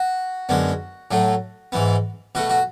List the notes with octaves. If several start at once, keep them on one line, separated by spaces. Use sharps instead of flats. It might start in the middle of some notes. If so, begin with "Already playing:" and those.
Already playing: F#4
F#2 D3 G#3 B3
A2 F#3 A3
G#2 E3 B3
B2 A3 F#4
F#4